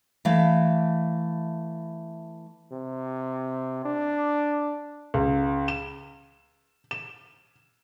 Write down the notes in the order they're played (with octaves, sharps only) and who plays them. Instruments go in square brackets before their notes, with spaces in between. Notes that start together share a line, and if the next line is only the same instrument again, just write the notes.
[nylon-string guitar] E3 A3 F5
[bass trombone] C3
D4
[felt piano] C#2
E7
E7